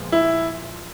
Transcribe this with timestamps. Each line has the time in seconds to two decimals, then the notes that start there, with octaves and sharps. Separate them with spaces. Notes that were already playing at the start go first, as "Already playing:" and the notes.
Already playing: A#2 F3 G#3 B3
0.12 E4